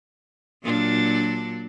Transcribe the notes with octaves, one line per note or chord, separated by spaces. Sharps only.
A#2 F#3 D4